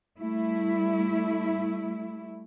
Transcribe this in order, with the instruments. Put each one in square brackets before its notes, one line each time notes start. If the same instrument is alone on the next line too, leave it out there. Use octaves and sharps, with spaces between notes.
[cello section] G3 A3 E4